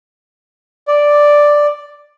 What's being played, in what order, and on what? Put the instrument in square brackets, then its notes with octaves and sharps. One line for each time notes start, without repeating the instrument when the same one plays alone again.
[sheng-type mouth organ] D5